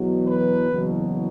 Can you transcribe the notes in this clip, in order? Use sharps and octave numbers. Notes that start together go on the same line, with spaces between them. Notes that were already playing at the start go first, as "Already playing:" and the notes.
Already playing: E2 B2 F#3
B4
F#1 E2 B2 F#3